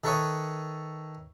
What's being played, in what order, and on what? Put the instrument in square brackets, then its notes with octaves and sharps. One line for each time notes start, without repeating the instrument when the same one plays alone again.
[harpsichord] D#3 A4 B4 C#5 E5 D#6